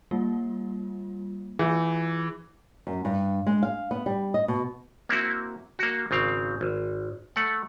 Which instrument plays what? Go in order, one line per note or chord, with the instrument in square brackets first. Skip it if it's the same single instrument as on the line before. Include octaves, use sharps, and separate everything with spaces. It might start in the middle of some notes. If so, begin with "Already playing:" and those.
[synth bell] G3 A#3 F4
[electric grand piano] E3 [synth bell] F4 G#4
[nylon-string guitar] F#2
G2
G#3
F5
B3
G3
D#5
B2
[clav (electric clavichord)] A#3 C4 E4 F#4
A#3 F#4
G#1 C#3 C4 F5
G#1
A3 F#5